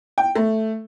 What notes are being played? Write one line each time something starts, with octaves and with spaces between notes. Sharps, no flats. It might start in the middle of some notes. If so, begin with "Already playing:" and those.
G5
A3